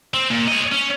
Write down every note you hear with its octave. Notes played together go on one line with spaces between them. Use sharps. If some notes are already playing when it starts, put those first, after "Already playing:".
C4
A#2
C#5 D#5
C#4